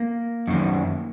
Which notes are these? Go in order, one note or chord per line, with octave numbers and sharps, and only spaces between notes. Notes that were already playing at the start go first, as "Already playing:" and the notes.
Already playing: A#3
F#2 D#3